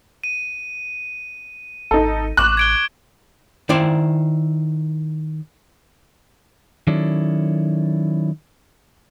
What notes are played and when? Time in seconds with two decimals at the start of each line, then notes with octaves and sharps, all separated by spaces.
0.24 D#7
1.91 G#1 D#4 A4
2.37 A1 C#6 D6 F#6
2.57 G#6 D7 G7
3.69 D#3 E4 C5 D5
6.87 D#3 F#3 C#4 E4 A4 D5